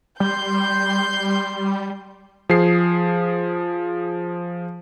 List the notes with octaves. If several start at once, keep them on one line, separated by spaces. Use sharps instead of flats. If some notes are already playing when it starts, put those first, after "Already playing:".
G3 C6 G6
F3 G#4 C7